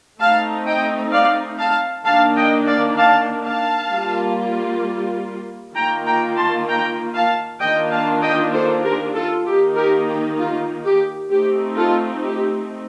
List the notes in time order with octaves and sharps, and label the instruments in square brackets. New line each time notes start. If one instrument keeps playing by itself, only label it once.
[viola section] A3 C4 D#4 F5 A5
D#5 G5
D5 F5
F5 A5
D#3 A#3 D4 F5 A5
D#5 G5
D5 F5
F5 A5
F5 A5
G3 A#3 F4
D#3 A#3 F4 G5 A#5
G5 A#5
A5 C6
G5 A#5
F5 A5
D#3 A#3 D4 F4 D#5 G5
F5 A5
D#5 G5
A4 C5
G4 A#4
F4 A4
D#3 A#3 D#4 G4
G4 A#4
G4
F4
G4
A3 C4 D#4 G4
F4 A4
G4